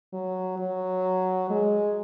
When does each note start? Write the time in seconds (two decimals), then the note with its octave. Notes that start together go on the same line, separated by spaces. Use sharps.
0.13 F#3
0.59 F#3
1.50 G#3